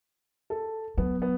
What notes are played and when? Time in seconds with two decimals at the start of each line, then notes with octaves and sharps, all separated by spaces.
0.50 A4
0.98 F#3 B3
1.22 B3